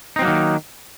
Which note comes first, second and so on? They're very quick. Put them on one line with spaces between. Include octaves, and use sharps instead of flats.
D#4 C4 F#3 A#3 D#3